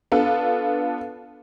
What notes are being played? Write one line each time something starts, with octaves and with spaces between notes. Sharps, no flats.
B3 D4 F4 A4